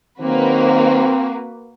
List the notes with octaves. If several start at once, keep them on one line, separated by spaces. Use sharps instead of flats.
D#3 F#3 A#3 C4 F#4 B4 C5